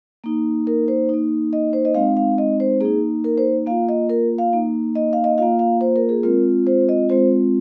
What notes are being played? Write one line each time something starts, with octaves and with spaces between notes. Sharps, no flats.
A#3 D#4
A#4
C5
A#3 D#4
D#5
C5
D#5
G#3 C4 D#4 F5
F5
D#5
C5
A#3 D#4 G#4
A#4
C5
A#3 F4 F5
D#5
A#4
F5
A#3 D#4
D#5
F5
D#5
A#3 F4 F5
F5
C5
A#4
G#4
G#3 C4 F4 A#4
C5
D#5
G#3 C4 F4 C5